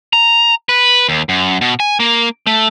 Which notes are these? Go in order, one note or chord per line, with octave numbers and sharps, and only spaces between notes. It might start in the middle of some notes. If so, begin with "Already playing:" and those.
A#5
B4
D#2
F#2
B2
G#5
A#3
A3